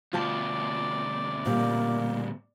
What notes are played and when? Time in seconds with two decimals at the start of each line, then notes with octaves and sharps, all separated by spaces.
0.13 D2 B2 F4 D5 G5 A5
1.46 A#2 G3 A#3